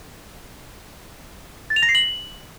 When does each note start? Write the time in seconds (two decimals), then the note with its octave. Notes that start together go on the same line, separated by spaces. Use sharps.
1.70 A6
1.76 F7
1.82 A#6
1.89 C7
1.95 F#7